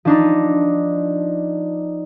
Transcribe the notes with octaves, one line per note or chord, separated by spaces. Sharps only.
F3 D4 D#4